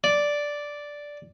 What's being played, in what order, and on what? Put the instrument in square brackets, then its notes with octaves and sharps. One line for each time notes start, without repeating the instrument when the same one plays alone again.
[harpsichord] D5